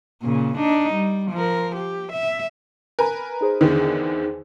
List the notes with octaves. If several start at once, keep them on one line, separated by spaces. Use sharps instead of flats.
A#2 C#3
D4 D#4
G3
F3 A#4
G4
E5
A#4 B4 G#5
D#4 G#4 C5
E2 D3 D#3